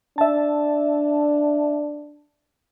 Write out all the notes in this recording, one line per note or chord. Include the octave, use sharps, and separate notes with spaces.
D4 E5 A5